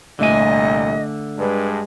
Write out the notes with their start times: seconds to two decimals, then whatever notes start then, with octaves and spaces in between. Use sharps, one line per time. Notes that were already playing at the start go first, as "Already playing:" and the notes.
0.19 C2 A#2 D3 A3 D#5 G#5
1.39 G2 G#3 D4 B4